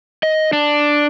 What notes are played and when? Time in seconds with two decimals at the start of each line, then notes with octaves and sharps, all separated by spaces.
0.23 D#5
0.53 D4